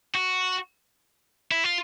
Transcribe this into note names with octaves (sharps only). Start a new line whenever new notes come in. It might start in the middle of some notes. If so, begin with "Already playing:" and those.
F#4
E4
F4